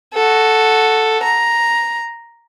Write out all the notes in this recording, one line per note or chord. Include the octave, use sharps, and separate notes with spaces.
F#4 A4
A#5